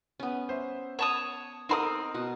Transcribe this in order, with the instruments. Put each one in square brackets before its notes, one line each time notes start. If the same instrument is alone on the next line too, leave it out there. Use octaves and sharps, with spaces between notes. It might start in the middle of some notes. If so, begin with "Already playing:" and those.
[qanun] B3 C#4
[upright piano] C5 E5
[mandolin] C#5 A5 D#6 [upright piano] F#5
[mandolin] C4 C6 D#6 [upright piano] D#4 A#4
[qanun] B2 F#5